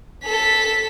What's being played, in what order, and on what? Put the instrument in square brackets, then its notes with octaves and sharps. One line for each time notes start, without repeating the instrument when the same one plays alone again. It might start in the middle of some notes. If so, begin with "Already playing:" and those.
[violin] A4 B6